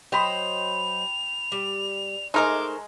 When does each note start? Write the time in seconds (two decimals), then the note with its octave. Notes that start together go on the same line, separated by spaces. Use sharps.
0.12 F#3 C5 D#5 G5 B5 F7
1.52 G3
2.34 G#3 A3 D#4 A#4 C5 D6